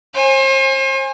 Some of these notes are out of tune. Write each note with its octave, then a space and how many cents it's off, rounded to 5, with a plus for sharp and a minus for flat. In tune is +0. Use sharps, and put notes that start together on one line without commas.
C5 +40 G#5 -10